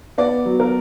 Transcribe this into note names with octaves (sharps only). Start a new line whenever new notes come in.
B3 D5
F#3
A#4